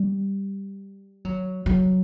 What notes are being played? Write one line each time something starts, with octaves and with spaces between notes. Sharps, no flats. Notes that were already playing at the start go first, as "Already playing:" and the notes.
Already playing: G3
F#3
F#3